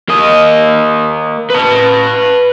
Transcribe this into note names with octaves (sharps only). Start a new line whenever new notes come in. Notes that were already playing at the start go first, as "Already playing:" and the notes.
A#3 D#5
B4 A5